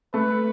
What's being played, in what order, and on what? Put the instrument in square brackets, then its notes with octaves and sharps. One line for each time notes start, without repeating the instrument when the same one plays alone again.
[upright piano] A3 [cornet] B4